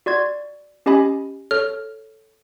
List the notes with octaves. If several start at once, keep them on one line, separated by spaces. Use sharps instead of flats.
F#4 D5 C6 G#6
C#4 G4 D#5 G#5 B5
A4 C#5 F6